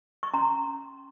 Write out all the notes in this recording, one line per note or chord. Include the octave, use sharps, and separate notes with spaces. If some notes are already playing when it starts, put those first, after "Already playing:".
C#6
C#4 A#5 C6